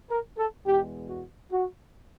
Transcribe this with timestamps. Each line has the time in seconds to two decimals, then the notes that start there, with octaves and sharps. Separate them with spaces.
0.10 A#4
0.37 A4
0.66 E2 B2 G#3 G4
1.08 F#4
1.51 F#4